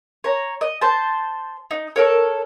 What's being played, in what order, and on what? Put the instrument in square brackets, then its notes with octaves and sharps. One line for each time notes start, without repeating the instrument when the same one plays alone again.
[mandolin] C#5 A#5
D#5
C5 A5
D#4
A4 A#4 C#5